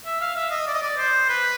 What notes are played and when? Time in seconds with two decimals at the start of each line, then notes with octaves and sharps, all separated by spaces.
0.06 E5
0.21 F5
0.36 E5
0.51 D#5
0.67 D5
0.74 D#5
0.83 D5
0.97 C5
1.29 B4